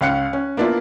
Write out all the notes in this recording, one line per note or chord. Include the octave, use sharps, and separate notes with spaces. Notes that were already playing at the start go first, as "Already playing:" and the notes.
C#2 C#4 F5 F#6 C#7
C#4
A#3 B3 D4 E4 F4